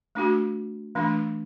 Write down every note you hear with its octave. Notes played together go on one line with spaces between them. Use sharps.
A3 D4 F#4
E3 A3 D4